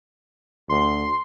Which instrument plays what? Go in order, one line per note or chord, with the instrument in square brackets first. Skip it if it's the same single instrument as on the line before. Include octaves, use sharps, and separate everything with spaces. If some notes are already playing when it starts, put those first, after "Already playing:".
[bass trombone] D2 [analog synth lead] C6